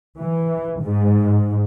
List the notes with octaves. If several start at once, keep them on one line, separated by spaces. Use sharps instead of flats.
E3
G#2